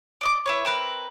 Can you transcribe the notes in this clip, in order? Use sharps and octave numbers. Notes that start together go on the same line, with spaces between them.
D5 D#5 D6
E4 B4 C#5
C4 A#4 B4